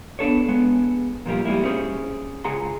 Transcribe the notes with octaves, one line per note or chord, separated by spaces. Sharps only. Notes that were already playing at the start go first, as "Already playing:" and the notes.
B3 D4 A4 C#5
G#3 B3
A#2 F3 G3 A#3
G3 G#3 A#3 E4
C#4 G#4 C5
C#2 G#4 F#5 A#5 C6